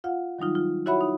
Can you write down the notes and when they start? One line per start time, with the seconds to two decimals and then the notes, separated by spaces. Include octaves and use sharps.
0.04 F4 F5 F#5
0.39 D#3 F#3 G3 D#4 F4
0.55 F4
0.86 E4 F#4 C#5 E5 F#5 B5
1.01 D#4